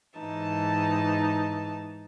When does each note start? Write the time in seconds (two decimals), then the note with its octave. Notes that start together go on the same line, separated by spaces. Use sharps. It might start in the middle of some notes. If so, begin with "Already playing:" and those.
0.19 G#2 E3 D#4 A5